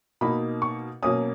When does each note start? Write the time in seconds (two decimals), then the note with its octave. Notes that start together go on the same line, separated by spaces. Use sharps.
0.21 B2 A#3 D#4 B5
0.62 C#6
1.02 B2 F#3 A#3 C#4 D#6